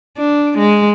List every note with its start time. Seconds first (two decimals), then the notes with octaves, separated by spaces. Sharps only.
0.17 D4
0.58 G#3